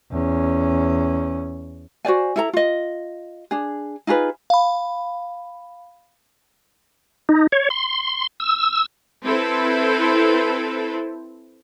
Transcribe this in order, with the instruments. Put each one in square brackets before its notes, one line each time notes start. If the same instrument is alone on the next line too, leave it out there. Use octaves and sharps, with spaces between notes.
[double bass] E2 C#4
[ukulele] F#4 C5 D5 G#5
E4 A4 A#5
F4 D#5
D4 G#4
D#4 F4 G#4 B4
[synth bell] F5 B5
[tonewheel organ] D#4
C#5
C6
E6
[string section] C4 E4 A4 B4